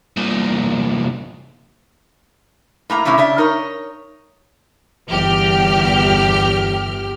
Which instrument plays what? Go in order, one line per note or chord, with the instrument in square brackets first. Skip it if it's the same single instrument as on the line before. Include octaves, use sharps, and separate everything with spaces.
[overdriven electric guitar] C2 A#2
[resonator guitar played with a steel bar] A2 A#3 A#5
A2 C3 A#3 C#4 E4
C#3 D4 E5
D#4 A#4 C#5
[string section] G1 E2 G4 F6